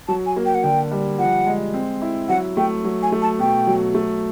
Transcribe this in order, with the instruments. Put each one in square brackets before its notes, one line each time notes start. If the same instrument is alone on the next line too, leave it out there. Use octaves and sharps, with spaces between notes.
[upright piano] F#3 [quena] A5
[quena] G#5
[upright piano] A#3
[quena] G5
F#5
[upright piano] D3 [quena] G5
[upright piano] G3
[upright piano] F3 [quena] F#5
[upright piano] G#3
C4
E4
[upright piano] F#3 [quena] F#5
[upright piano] A3 [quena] G5
[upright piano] F#3
[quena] G#5
[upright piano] A3
[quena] A5
[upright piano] B2 [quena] G5
[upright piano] F#3
A3